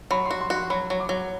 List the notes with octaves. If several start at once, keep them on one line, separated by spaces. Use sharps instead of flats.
F#3 B5
F#4 C6
C6
F#4
C6
F#3 B5
F#3
D6
F#3